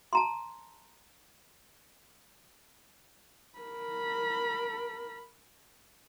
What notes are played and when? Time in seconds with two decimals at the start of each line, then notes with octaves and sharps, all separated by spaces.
0.13 A5 A#5 C6
3.59 A#4 B5